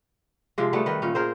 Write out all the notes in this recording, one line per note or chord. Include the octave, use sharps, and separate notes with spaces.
C3 F3 G#3
G3 A3 B3
D#3 B4
A#2 C#4
G#4 A#4 C5